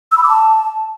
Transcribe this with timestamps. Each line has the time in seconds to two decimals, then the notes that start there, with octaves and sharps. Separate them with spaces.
0.12 E6
0.17 B5
0.23 D6
0.29 A5